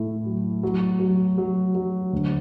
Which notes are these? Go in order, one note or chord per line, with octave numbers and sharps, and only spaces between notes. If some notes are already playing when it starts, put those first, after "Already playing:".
Already playing: A2 A3 E4
F#3
F#3
F#3
F#3
F#3
D2